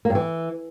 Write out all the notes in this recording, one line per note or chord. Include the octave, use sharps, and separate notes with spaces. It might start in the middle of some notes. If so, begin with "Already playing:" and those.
A#3
G2
E3